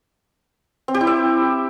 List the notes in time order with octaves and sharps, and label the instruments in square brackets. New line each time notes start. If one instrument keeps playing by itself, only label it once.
[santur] C4
G4
E4
E5